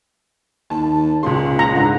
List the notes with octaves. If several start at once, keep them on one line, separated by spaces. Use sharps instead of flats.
D#2 A5
C#2 A#2 C#3 C6
A#5
G#2 D3